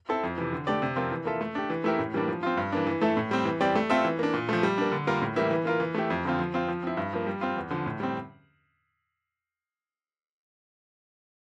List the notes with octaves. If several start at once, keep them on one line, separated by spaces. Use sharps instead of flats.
C4 E4 A4
F2
C3 E3
D3
A3 D4 G4 D5
C3
F3 C4 F4 A#4
E3
A#3 F4 A4 E5
A3
D4 G4
E3
A3 E4 G4 A#4
A2
E3 G3 A#3 D4
F3
C4 F4
G2
E3 A#3 D4
E3
A3 E4 A4 E5
A2
G3 C4
E3
G3 C4 G4 D5
A3
C4 F4 A4 E5
E3
A#3 D4
A#2
F3 A3
G3
A#3 D4
D3
G3 A#3 F4 A#4
A2
E3 G3 A#3 E4
E3
A#3 F4 A#4
E3
A3 E4 G4
F2
D3 F3 C4 F4
F3
C4 F4
F3
C4 E4
G2
F3 A#3
G3
C4 F4
E2
D3 F3
A2
G3 C4